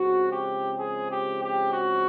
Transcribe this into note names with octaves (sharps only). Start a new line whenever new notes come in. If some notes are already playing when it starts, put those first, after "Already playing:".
Already playing: C#3 F3 G#3 C4 F#4
G4
G#4
G4
G4
F#4